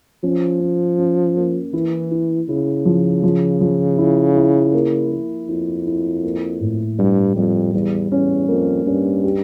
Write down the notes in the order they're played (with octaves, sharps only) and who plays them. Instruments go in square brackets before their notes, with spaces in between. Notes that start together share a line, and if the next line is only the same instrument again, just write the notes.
[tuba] F3 [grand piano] C#4
[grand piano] C#4
C#4
A#3
[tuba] E3 [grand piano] E4
[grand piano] E4
[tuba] C#3 [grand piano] E4
[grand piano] F3
F3
F3
E4
E4
A#3
A#3
[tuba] F2 [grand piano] E4
[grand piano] E4
A#3
A2
[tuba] G2 [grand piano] G3
[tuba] F2 [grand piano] G3
[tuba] E2 [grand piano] G3
[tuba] E2 [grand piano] C#4
[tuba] F2 [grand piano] A#3
[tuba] G2 [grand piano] C#4
[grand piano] G4